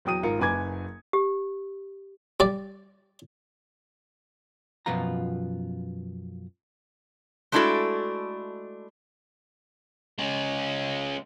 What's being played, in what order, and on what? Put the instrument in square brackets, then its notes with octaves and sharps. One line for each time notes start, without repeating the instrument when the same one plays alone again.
[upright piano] E2 F#3 G5 D#6 D#7
G#1 F4 A#4 C#7
F#1 F#2 B4 G#5 D6 G#6
[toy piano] G4
[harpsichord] G3 D5
[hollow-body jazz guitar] F#2 B2 F3 B3 F4 A#5
[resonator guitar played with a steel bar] G#3 A3 D4 E4 F#4 A4
[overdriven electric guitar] G#3 C#4